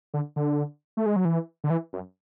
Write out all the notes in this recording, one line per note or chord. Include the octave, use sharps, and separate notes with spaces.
D3
D3
A3
G#3
F#3
E3
D3
E3
F#2